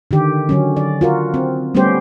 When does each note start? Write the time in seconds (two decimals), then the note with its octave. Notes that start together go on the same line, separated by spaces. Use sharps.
0.11 D3 D#3 G4
0.49 D3 F#3 C#4
0.77 D5
1.01 F4 F#4 A#4
1.34 C4
1.75 G3 A3 B3 C#4 G4 C5